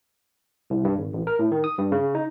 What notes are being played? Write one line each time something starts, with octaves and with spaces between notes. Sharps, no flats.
C2
G2
G#1
A1
A#4
A2
D#3
D#6
G2
C#3
D#4